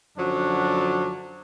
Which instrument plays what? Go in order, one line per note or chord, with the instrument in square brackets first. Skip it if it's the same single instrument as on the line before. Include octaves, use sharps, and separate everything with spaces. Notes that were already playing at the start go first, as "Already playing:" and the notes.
[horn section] F#2 D3 F3 F#3 D4